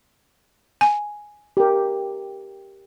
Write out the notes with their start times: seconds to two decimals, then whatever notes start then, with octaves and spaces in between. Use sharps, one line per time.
0.81 G#5
1.57 G4 A#4